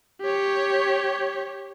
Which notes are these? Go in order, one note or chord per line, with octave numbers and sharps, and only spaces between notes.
G4 C#5